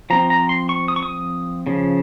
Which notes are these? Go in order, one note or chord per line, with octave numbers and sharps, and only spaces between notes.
F3 C4 A#5
A#5
C6
C#6
D#6
C#6
D#6
C#3 F3